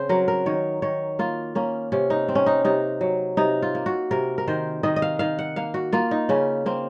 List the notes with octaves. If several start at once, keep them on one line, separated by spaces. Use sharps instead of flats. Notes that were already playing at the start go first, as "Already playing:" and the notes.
Already playing: C#3 C4 C5
F#3 A#4
A#4
D#3 C#5
D#3 C#5
A#3 F4
A#3 C#4
C3 C#4
D#4
C4
C#4
D#4
C3 D#4
F#3
C3 D#4
F4
A#3
F#4
C3 A#4
A#4
D#3 C5
D#3 D#5
D#5
F5
D#3 F5
F#5
A#3 F5
F#4
A#3 F4
D#4
C#3 C#4
A#3 C4